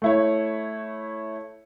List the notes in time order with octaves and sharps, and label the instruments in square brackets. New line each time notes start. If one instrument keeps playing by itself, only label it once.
[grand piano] A3 E4 C#5